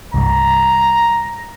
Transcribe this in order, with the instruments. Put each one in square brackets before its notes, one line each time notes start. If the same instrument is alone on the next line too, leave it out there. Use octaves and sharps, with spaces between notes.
[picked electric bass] C2 G2 [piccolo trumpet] A#5